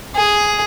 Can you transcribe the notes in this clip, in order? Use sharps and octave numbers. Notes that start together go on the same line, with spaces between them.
G#4